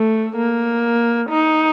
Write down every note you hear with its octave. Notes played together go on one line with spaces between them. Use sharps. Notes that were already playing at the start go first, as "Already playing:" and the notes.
Already playing: A3
A#3
D#4